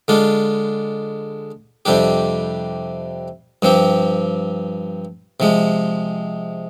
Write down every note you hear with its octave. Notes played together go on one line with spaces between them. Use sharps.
D3 G#3 D4 F4
F2 C3 G3 D4 G4
G2 F3 C4 G4
C3 F3 G#3